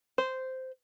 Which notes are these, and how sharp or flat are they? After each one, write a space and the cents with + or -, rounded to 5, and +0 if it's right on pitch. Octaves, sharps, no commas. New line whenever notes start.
C5 -10